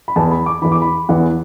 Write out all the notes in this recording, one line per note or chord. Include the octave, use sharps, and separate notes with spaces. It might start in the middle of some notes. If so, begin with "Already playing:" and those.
B5
E2 E3 A5
B5
D6
E2 E3 B5
D6
B5
E2 E3 F#5